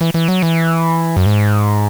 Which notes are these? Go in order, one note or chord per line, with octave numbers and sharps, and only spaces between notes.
E3
E3
F#3
E3
F#2
G#2